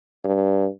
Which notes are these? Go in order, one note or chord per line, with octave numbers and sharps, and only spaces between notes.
G2